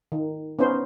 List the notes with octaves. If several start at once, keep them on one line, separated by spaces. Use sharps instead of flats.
D#3
B3 C#4 D#4 C5